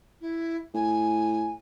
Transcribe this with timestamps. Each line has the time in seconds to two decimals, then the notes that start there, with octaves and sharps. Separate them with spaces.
0.20 E4
0.74 A2 G#5